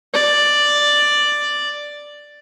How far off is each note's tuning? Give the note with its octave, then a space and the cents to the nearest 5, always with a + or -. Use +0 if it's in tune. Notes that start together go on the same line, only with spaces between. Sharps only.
D5 +5